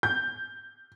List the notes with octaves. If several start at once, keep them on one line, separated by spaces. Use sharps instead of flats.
G6